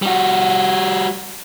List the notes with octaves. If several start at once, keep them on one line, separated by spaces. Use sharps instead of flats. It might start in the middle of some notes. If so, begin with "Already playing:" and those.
G3 F#4